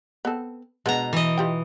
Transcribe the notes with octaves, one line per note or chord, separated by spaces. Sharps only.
B3 C4 A4
B2 G#3 B3 D4 A#5
E3 D#5
F4 G4 G5